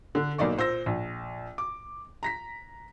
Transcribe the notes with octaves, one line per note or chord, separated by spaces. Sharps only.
D3
B1 A#3 D#4 D5 C#6
A#2 C5 E6 A#6
A#1
D6
A#5 A#6 B6